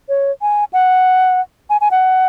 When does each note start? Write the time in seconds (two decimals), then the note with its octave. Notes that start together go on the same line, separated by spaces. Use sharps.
0.09 C#5
0.42 G#5
0.73 F#5
1.70 G#5
1.81 G#5
1.91 F#5